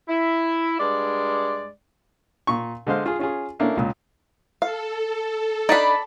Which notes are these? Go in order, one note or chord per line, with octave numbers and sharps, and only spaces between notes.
E4
G2 G#3 D5
A#2 C#6
D3 G#3 C5 F5
F4 G#4
C#4 F4 G#4
A3 A#3 C#4 D4 E4
C#2 A#2
A4 F5
D4 D#4 D5 A5 B5